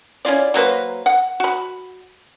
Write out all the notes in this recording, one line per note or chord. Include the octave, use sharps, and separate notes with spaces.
C#4 E4 F4 D5
F#3 A#3 B4 C5
F#5
F#4 B5